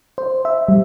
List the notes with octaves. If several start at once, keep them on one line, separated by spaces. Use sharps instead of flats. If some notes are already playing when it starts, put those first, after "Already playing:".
C5
E5
G3